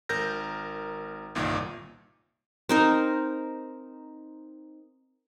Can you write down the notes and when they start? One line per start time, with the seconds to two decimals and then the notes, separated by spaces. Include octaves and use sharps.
0.09 G#1 A#4 G6 A#6
1.35 G1 C2 A#2 D#3
2.69 C4 D#4 A#4